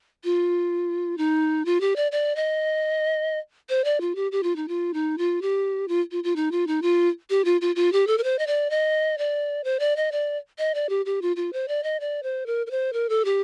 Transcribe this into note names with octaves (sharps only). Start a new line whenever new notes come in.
F4
D#4
F4
G4
D5
D5
D#5
C5
D5
F4
G4
G4
F4
D#4
F4
D#4
F4
G4
F4
F4
F4
D#4
F4
D#4
F4
G4
F4
F4
F4
G4
A4
A#4
C5
D#5
D5
D#5
D5
C5
D5
D#5
D5
D#5
D5
G4
G4
F4
F4
C5
D5
D#5
D5
C5
A#4
A#4
C5
A#4
A4
G4